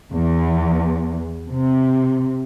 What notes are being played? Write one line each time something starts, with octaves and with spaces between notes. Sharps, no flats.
E2
C3